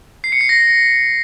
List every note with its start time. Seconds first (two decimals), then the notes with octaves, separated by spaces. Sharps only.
0.24 C7
0.32 C#7
0.41 C7
0.49 A#6